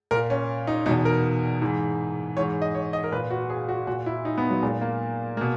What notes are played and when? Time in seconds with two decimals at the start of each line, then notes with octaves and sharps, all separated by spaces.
0.11 A#2 A#4
0.30 C#4
0.67 D#4
0.86 E2 B2 D#4
1.05 A#4
1.62 G#2 E3
2.37 G#2 E3 C#5
2.62 D#5
2.75 C#5
2.93 D#5
3.04 A#4
3.12 A#2 B4
3.30 F#4
3.50 G#4
3.69 F#4
3.87 A#2 F#4
4.06 E4
4.25 D#4
4.38 B3
4.50 F#3
4.63 A#2 G#3
4.82 A#3
5.37 B2 A#3